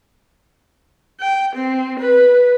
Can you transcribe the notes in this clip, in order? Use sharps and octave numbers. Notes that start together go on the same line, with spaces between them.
G5
C4
B4